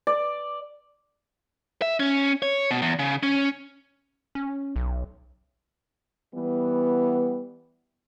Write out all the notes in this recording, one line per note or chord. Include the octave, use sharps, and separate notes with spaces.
D5
E5
C#4
C#5
B2
E2
C#3
C#4
C#4
B1
E3 G3 B3